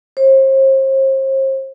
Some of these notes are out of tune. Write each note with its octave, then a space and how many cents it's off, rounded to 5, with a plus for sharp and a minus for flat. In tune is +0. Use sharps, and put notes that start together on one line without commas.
C5 +40